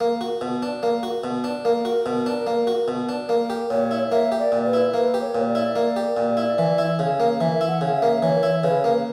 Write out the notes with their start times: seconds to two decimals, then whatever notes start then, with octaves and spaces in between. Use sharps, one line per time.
0.01 A#3
0.21 F#4
0.41 B2
0.62 D4
0.83 A#3
1.03 F#4
1.24 B2
1.44 D4
1.64 A#3 A#4
1.85 F#4
2.06 B2
2.26 D4
2.47 A#3
2.67 F#4
2.88 B2
3.09 D4
3.29 A#3 A#4
3.50 G4
3.70 A#2 C#5
3.91 E4
4.11 A#3 E5
4.32 G4
4.39 D5
4.52 A#2
4.66 B4
4.73 E4
4.93 A#3 B4
5.14 G4
5.21 C#5
5.35 A#2
5.48 D5
5.55 E4
5.76 A#3
5.96 G4
6.17 A#2
6.37 E4
6.58 E3
6.78 E4
6.99 C#3
7.20 A#3
7.40 E3 E5
7.61 E4
7.68 F#5
7.81 C#3
7.95 E5
8.02 A#3
8.22 E3 C#5
8.43 E4
8.63 C#3 B4
8.84 A#3